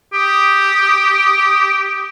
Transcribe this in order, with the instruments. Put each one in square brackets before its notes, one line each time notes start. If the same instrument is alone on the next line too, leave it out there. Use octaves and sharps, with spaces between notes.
[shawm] G4 [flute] D#6